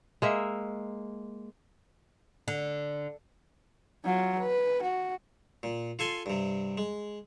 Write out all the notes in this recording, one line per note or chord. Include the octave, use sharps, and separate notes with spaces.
G#3 A#3 E5
D3
F#3 F4
B4
F#4
A#2
F4 A4 G#5 C6
G2 C3
G#3